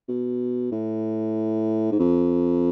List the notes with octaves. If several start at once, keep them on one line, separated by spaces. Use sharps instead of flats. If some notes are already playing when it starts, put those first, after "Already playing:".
B2
A2
G#2
F2